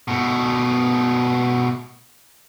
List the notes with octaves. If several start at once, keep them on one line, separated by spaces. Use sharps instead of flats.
B2 A3